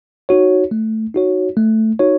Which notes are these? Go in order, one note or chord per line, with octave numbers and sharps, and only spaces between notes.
D#4 F#4 C#5
A3
D#4 F#4 C#5
A3
D#4 F#4 C#5